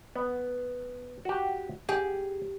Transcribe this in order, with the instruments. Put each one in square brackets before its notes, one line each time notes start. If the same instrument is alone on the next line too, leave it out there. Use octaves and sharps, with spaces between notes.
[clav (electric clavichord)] B3
F#4 G4
[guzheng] G4 [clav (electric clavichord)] G#4